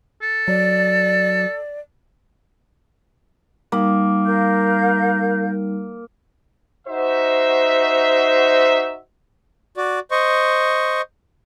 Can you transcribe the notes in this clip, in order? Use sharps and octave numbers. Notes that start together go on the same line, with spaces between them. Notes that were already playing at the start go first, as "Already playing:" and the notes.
A4
F#3 D5
G3 A#3 D#4
A#4 F5 G6
D#4 F#4 C5 E5
F#4 D5
C5 D#5 C#6